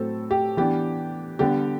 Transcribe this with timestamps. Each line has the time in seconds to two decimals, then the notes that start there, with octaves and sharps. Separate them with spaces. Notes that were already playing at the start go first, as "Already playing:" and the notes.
Already playing: A2 F#3 C4 A4
0.31 G4
0.57 E3 B3 D4 G4
1.39 D3 G3 B3 D4 G4